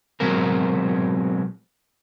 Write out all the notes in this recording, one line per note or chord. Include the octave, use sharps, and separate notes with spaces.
B2 F#3 G#3 C4 G#4 A#4